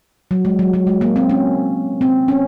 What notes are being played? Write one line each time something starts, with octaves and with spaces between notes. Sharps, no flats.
F#3
G#3
F#3
F#3
G#3
A#3
C4
C#4
C4
C#4